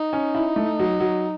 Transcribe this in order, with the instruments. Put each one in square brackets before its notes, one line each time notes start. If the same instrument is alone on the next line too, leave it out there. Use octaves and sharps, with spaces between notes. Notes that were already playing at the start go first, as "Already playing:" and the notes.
Already playing: [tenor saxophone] D#4
[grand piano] C#4
E4
A3
F#3
F#3